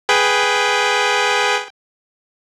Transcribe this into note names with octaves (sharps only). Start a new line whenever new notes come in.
G#4 B4 G5